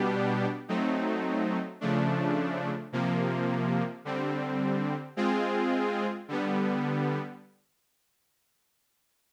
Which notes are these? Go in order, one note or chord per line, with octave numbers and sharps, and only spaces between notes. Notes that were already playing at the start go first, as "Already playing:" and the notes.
Already playing: B2 G3 B3 D4 G4
F#3 A3 C4 D#4
C#3 F3 A3 D4
C3 F3 A#3
D3 G3 C4
G#3 C4 F4 G#4
D3 G3 B3